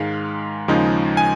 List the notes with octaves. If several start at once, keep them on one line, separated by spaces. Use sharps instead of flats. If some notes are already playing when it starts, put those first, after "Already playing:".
Already playing: G#2 D#3 G#3 F5
D#2 C#3 F3 G#3 D#4
G#5